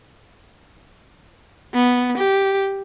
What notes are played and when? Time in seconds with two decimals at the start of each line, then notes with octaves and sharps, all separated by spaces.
1.74 B3
2.18 G4